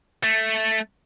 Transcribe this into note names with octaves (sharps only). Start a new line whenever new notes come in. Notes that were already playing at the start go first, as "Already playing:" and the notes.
A3